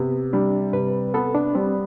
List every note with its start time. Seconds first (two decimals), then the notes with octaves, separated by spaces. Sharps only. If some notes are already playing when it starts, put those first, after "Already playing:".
Already playing: C3 B3
0.33 G3 D4
0.73 C3 B4
1.14 B3 A4
1.34 D4
1.55 G3 C4